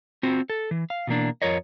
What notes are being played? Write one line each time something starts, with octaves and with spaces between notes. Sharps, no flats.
C4 F4 F#4
A4
E3
F5
B2 E3 A#3 D4
F2 F4 A#4 C#5 D#5